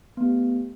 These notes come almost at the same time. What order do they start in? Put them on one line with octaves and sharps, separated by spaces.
B3 A3 G4